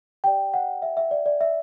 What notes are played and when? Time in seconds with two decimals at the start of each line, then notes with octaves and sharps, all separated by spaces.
0.24 G4 D5 G5
0.54 F#5
0.82 E5
0.97 E5
1.11 D5
1.26 D5
1.41 E5